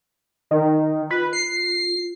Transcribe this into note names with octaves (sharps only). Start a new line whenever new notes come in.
D#3
F4 B4
C7